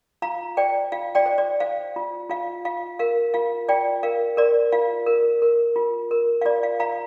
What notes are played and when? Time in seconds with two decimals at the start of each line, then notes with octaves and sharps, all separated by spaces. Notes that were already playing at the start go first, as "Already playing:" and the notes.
0.22 F4 F5 A#5
0.57 C5 D5 G5
0.92 F4 F5
1.15 D5 G5
1.26 C5
1.38 D5
1.60 C5 F5
1.96 F4
2.30 F4 F5
2.65 F4 F5
2.99 A#4 F5
3.34 F4 F5
3.69 F4 D5 G5
4.03 A#4 F5
4.37 A#4 D5
4.72 F4 F5
5.07 A#4
5.42 A#4
5.76 F4
6.11 A#4
6.41 F5
6.45 F4 D5
6.63 F5
6.80 F4 F5 A#5